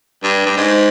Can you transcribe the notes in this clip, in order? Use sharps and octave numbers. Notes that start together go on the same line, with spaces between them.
G2
G2
G#2